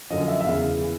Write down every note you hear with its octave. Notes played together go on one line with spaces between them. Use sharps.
F#2 D3 F3 D#5
E5
E5
E2 C#3 E3 F5
E3